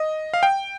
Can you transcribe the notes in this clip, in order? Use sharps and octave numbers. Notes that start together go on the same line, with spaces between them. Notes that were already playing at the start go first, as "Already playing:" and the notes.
Already playing: D#5
F5
G5